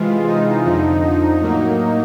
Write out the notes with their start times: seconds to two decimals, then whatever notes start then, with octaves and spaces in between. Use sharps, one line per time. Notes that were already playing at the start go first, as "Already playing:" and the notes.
Already playing: C3 E3 G#3 F4
0.27 D#4
0.65 F2 D3 F3 D#4
1.02 D#4
1.41 A2 F#3 A#3